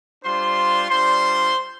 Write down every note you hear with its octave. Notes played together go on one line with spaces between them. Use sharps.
G3 D4 F4 C5 C6
G3 D4 F4 C5 C6